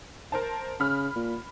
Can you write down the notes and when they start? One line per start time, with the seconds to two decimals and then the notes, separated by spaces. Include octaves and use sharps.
0.32 A#4 C5 A5
0.80 C#3 B5 F6
1.16 A#2